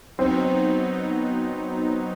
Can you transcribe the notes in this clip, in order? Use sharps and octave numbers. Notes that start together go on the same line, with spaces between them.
F#3 B3 C4 D#4